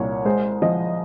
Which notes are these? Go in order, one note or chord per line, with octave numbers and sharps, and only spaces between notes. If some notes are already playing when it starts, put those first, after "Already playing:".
Already playing: C2 A#2 C#5
G#3 C5
F3 D#5